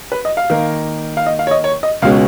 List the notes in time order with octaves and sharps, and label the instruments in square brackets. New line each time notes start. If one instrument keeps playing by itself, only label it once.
[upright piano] B4
D#5
F5
[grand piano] D#3 A#3 D#4 A#4
[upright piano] F5
D#5
F5
C#5
D#5
C#5
D#5
[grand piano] C#2 B2 G#3 C#4 [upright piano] F5